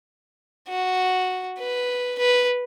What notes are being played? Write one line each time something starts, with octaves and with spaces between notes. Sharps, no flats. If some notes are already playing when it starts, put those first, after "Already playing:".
F#4
B4
B4